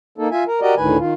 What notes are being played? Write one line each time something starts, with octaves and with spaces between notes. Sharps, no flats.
A#3 D#4 A4
F4 E5 G#5
A#4
F#4 G4 A#4 D5 D#5
D2 A2 D#3 B4 G#5
D#3 F4